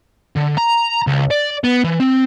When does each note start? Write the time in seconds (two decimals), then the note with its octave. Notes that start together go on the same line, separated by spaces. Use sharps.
0.36 D3
0.58 A#5
1.07 C#2
1.31 D5
1.64 B3
1.84 E3
2.00 C4